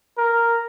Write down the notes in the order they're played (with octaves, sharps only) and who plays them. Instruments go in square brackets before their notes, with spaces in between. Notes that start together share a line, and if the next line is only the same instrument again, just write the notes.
[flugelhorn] A#4